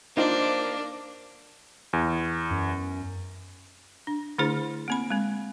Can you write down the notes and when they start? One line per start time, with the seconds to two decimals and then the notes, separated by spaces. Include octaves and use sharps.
0.17 A#3 D4 D#4 F4 C5
1.93 E2
2.51 F#2
4.07 D4
4.38 D3 A3 D4 E4 G#4 C5
4.88 A#3 C4 B5
5.10 G#3 C4